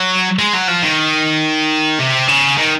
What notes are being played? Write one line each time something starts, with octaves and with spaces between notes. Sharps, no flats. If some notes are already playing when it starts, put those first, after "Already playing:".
Already playing: F#3
G#3
F#3
F3
D#3
C3
C#3
D#3